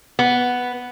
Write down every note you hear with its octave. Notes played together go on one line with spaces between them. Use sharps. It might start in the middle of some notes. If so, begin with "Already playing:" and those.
B3